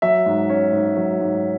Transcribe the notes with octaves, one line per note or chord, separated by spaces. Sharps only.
F#3 E5
G#2
C#4
G#2
F#3
G#2